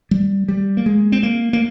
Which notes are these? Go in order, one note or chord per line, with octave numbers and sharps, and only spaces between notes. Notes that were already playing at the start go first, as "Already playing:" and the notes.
G3
G3
A#3
G#3
C4
A#3
A#3